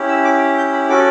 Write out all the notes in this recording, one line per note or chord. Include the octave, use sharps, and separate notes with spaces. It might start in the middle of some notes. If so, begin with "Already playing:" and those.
Already playing: C#4 E4 G4
E6
D6
G6
B5
C#4 F#4 A4 D6